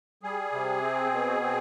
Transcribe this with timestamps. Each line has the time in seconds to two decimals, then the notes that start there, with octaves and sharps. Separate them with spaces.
0.23 G3 G#4
0.52 C3
0.82 C4
1.11 B2
1.42 C4